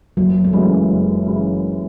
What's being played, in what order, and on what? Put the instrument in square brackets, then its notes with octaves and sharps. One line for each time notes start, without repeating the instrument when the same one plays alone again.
[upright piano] F#1 [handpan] F#3
[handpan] A3
[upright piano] F#2 C#3 E3 [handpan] G#3
[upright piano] F#1
F#2 C#3 E3